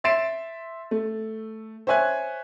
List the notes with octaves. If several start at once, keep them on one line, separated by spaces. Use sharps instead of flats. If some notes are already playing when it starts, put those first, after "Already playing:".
E5 C6 A6 C7 D7 E7
A3
C5 C#5 E5 G#5 F#6 G#6